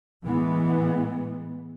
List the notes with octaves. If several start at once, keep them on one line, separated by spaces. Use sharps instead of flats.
A2 E3 G#3 B3